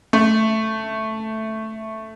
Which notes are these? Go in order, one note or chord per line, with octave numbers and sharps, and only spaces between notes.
A3